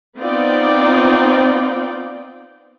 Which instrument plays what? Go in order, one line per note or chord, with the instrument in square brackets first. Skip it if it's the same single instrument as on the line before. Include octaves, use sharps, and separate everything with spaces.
[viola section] B3 C4 D#4 F4 D5 G5